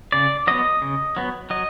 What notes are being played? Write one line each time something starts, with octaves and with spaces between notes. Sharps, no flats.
C#3 D5
F#3 B3 D#5
C#3
F#3 B3
F#3 D#5